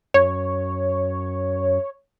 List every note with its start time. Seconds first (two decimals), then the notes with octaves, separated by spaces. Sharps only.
0.14 F#2 C#5